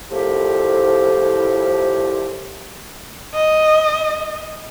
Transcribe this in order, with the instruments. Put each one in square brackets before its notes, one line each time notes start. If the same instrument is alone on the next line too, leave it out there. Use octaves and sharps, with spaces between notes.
[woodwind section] C2 A2 F3 G4
[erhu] D#5